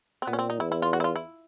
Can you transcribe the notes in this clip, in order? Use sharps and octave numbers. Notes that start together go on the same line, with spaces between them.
C4
A#2 B3
C#4
C4
D#4
E2 E4
E4
F4
F#4
E4
F4
E4